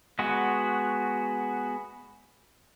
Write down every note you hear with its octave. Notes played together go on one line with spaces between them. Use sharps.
G#3 B3 F#4